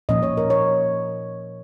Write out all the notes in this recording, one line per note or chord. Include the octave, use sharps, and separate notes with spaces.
A#2 F3 C#4 D#5
C#5
A#4
C#5